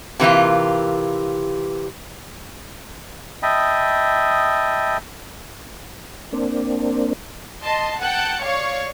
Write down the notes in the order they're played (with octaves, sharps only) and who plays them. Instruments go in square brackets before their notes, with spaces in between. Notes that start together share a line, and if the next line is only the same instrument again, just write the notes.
[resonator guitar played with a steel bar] C3 E3 A#3 F4
[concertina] D#5 E5 G5 A5 B5 D#6
[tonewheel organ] A#3 C4 D4
[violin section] D#5 A5 C6
F#5 G5 A5 F#6 C#7
C#5 D5 F5 C#6